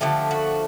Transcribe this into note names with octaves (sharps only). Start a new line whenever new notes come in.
D3 F3 A3 G4
F#4